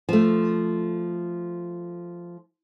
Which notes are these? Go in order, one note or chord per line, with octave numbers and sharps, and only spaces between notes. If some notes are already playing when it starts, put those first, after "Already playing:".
F3 A3